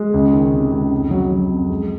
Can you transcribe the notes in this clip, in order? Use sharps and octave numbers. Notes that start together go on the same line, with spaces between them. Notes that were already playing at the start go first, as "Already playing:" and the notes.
Already playing: G#3
C#2
D#3
C3
C#2
F2
F#3
F#3
F2
G#3